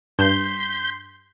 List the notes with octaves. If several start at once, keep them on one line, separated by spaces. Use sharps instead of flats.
G2 C6 G6 B6